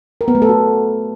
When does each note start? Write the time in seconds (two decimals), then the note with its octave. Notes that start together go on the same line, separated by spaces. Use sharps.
0.21 A#4
0.28 B3
0.35 A3
0.42 A4
0.49 F#4